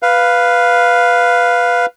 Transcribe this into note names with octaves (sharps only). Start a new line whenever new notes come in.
B4 F5